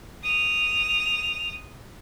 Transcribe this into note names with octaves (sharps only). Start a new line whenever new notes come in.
D#6 F7